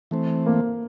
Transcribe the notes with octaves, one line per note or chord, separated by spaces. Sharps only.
E3 A3 C4
A#3